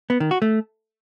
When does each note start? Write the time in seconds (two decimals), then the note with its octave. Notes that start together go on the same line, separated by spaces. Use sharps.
0.10 B3
0.20 D#3
0.31 F#4
0.42 A3